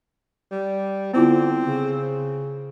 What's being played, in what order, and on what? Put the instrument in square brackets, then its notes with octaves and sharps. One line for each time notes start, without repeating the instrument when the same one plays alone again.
[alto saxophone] G3
[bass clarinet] D3 [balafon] B3 E4 F4 [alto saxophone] C4
[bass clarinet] C#3